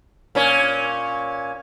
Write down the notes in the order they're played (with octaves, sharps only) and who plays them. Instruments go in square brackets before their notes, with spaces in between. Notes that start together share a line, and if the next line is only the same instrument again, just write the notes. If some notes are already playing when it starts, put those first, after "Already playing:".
[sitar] A#2 C#4